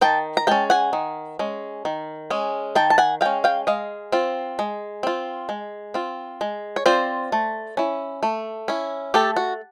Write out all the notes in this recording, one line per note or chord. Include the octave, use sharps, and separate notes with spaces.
D#3 G5 A5
A#5
G#3 C#4 G5 A5
F#5 G#5
D#3
G#3 C#4
D#3
G#3 C#4
D#3 G5 A5
A5
F#5 G#5
G#3 C#4 F5 G5
F5 G5
G#3 D#5 F5
C4 F4
G#3
C4 F4
G#3
C4 F4
G#3
C#5
C4 F4 C5 D5
A3
C#4 E4
A3
C#4 E4
A3 G4 A4
F#4